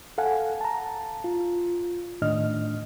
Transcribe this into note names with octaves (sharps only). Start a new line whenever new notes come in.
A4 F5 F#5 G#5
A5 A#5
F4
A2 D#3 D4 D#5 F6